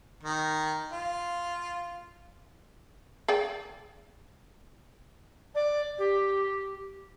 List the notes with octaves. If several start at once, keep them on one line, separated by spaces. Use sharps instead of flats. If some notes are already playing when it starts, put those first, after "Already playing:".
D#3
F4
G#4 D5 G5
D5
G4